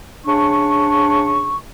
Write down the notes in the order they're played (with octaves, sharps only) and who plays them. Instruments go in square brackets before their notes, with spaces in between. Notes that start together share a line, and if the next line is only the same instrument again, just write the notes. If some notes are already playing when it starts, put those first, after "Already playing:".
[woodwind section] C#3 D4 C#6